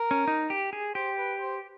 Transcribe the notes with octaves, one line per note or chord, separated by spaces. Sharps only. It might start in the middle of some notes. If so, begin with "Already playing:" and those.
Already playing: A#4
C#4
D#4
G4
G#4
G4 C5
B4
C5